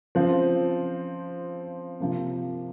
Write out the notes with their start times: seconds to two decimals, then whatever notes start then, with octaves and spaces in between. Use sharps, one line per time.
0.15 C#3 F3 C4
2.00 C3 F3 A#3